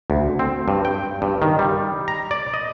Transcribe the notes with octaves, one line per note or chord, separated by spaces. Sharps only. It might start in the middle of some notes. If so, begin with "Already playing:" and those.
D2
C4
G2
G5
G2
D#3
G3
A#5
D5
D#5